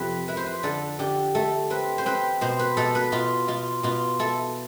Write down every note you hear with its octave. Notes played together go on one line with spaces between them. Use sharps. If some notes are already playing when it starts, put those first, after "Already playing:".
Already playing: F2 C3 F3 G4 B4
E4 B4
C5
B4
D3 A4
D3 G4
A3 A4
C4 B4
C5
C4 B4
B2 C5
B4
B2 A4
B4
B2 F4
B2 F4
B2 F4
E4 A4